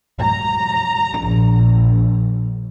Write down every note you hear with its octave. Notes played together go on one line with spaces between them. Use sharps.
A#5
A#1